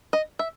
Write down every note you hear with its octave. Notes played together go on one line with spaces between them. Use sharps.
D#5
E5